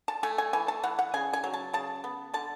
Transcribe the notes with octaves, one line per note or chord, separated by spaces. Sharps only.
A5
A3 G#5
G#5
E3 G#5
A5
E3 F#5
F#5
C#3 G#5
G#5
F#3
A5
C#3 A5
B3
D3 A5